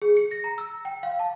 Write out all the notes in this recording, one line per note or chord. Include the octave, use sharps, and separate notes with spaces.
G#4
C#7
A#6
A#5
E6
G5
F5
A5